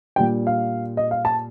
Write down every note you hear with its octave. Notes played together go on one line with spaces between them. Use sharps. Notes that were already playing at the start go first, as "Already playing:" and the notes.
A#2 G3 D4 G5
F5
D#5
F5
A5